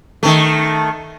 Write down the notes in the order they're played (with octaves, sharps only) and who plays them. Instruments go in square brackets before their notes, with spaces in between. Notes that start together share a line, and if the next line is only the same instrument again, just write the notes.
[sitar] D#3 A3